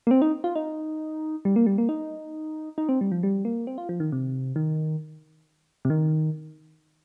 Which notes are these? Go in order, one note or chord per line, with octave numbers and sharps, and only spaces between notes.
A#3
C4
D#4
F4
D#4
G3
A#3
G3
A#3
D#4
D#4
C4
G3
F3
G3
A#3
C4
F4
F3
D#3
C3
D#3
C3
D#3